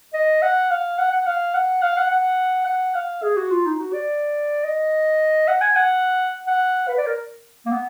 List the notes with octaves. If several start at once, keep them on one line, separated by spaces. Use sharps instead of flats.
D#5
F#5
F5
F#5
F#5
F5
F#5
F5
F#5
F#5
F#5
F5
G#4
F#4
F4
D#4
F#4
D5
D#5
F#5
G#5
F#5
F#5
B4
D5
A#4
A#3
B3